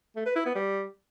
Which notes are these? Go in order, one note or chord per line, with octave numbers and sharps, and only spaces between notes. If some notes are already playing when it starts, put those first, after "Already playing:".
A3
B4
E4
B3
G3